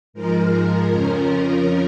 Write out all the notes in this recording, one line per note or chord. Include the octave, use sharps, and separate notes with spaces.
G#2 F3 G#3 A#4
F2 C#3 F3 C#4